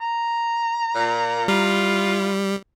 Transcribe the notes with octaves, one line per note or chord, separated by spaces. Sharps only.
A#5
A#2
G3 E4 F4